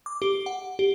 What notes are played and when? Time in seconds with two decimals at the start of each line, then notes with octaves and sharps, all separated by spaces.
0.06 D6
0.22 G4
0.46 F#5
0.79 G4